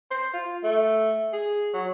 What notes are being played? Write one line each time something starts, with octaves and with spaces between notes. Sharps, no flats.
C5
F4
A3
G#4
F#3